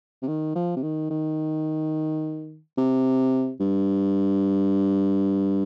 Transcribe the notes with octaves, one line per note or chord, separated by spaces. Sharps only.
C3
D#3
F3
C3
D#3
D#3
C3
G2